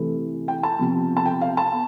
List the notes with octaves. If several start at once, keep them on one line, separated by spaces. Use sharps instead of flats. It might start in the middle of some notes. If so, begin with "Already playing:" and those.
Already playing: C3 E3 A3
G5
A5
C3 F3 B3
A5
G5
F5
A5
B3